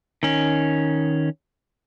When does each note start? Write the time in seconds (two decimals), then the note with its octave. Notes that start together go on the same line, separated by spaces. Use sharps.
0.23 D#3 C#4